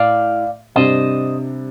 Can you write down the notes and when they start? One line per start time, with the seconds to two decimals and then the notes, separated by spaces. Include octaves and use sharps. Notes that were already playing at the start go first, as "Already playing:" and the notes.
Already playing: A2 D5 F5
0.76 C3 G3 D4 C5 D#5